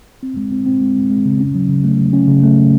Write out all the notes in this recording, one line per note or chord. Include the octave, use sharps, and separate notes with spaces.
C4
G#3
C4
C4
G#3
G#3
G#3
C#3
C#4
F#3
C#3
A3
F#3
C#4
C#3
A3